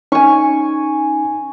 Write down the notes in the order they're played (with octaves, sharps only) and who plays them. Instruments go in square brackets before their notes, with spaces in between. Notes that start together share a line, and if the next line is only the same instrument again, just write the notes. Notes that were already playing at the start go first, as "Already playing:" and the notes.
[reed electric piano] C#4 D#4 [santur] G#5 C#6